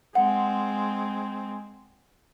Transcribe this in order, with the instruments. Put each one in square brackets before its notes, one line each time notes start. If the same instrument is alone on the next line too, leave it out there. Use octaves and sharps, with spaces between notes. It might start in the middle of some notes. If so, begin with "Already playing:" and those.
[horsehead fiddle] G#3 C4 [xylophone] F#5